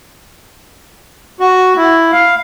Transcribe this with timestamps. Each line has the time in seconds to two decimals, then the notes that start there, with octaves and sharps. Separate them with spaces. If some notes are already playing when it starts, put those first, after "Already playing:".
1.40 F#4
1.77 E4
2.12 F5